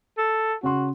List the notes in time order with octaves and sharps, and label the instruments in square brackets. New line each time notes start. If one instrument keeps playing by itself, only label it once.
[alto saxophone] A4
[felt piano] C#3 C6 [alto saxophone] F#4